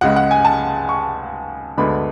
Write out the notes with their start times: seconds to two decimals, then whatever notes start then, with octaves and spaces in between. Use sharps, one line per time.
0.01 C#2 C#3 G#3 F#5
0.16 F#5
0.31 G#5
0.45 A5
0.89 C#6
1.77 D2 D3 G#3 B3 D4 B5